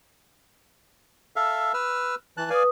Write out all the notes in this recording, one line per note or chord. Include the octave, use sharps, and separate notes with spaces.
A4 E5 F5
B4 E6 F6
E3 A5 F#6
B4 D5 F5 G#5 D#6